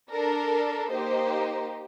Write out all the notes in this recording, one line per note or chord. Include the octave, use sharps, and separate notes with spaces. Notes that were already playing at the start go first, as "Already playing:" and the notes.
D4 A4 A#4
A#3 D#4 G4 C5